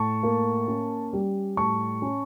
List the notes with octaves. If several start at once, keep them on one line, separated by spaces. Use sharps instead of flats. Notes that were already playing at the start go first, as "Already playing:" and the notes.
Already playing: A2 A5 C#6
A#3
C#4
G3
A2 A5 C#6
C#4